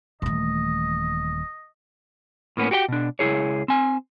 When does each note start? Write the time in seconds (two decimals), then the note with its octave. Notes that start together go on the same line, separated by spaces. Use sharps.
0.22 D#1 E3 A3 D#5
2.57 A2 A#3 B3 C#4
2.71 F#4 G4 C#5 G5
2.89 B2 D4
3.19 C#2 E4 G#4 C#5
3.68 C4 G#5